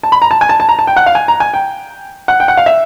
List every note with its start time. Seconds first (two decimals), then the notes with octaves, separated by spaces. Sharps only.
0.03 A5
0.12 B5
0.22 A#5
0.31 A5
0.41 G#5
0.49 A5
0.60 A5
0.69 A#5
0.79 A5
0.87 G5
0.96 F#5
1.06 F5
1.15 G#5
1.28 A#5
1.40 G#5
1.54 G5
2.28 F#5
2.40 G5
2.48 F#5
2.57 F5
2.66 E5